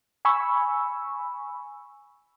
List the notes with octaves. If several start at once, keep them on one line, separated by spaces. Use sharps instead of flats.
G#5 B5 C#6 E6